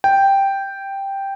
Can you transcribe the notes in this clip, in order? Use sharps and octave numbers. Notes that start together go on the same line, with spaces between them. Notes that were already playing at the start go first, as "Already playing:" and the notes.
G5